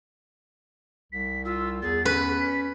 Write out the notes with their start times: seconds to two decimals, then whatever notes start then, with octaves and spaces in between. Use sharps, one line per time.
1.12 C2 B6
1.45 F4 E6
1.82 E2 G#4 A6
2.05 C#4 B4 B6